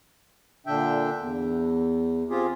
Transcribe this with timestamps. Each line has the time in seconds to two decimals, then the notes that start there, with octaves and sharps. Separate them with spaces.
0.66 A#2 D3 D4 E5 G5
1.17 E2
2.30 C4 F4 G4 G#4